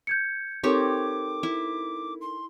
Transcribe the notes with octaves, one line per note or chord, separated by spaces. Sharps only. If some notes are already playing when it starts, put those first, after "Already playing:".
G6 G#6 C#7
C4 D#4 G4 A4 A#4 C#5 D6
E4
C6